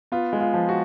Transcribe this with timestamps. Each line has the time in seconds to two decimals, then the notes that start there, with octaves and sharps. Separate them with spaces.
0.12 B3 F4
0.33 G#3
0.40 F4
0.54 F3
0.69 F#4